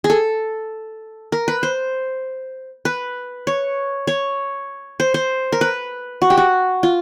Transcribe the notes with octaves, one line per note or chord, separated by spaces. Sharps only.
G#4
A4
A#4
B4
C5
B4
C#5
C#5
C5
C5
A#4
B4
F#4
G4
F#4
F4